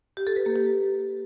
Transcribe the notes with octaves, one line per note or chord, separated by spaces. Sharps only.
G4
A4
B4
A#3
G4